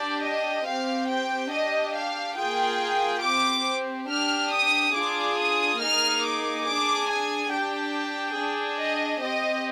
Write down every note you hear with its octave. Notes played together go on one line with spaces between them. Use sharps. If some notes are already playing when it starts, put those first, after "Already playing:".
Already playing: D4 G4 D5
D#5
C4 G4 F5
G5
D4 G4 D#5
F5
A#3 F4 G#4 G5
C4 G4 D6
D4 G4 F6
D#6
D4 F4 G#4 D6
D#6
A#3 D#4 G#4 F6
D6
D4 G#4 D6
G#5
D4 G4 G5
D4 G#4
D#5
C4 G4 D#5